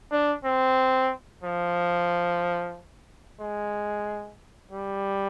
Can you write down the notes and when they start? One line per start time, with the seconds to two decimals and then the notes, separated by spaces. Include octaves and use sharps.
0.12 D4
0.44 C4
1.43 F3
3.40 G#3
4.71 G3